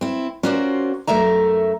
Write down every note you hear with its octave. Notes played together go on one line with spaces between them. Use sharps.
C4 E4
C#4 F4 F#4 A#4 C5 D5
F#2 A3 A#4 E5 A#5